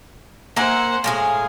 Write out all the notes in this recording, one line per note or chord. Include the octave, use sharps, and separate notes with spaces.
A#3 C5 E5 F#5 G#5
A2 G#3 G#4 F5